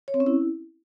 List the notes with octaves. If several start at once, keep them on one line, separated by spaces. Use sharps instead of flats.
C#5
C4
C#4
E4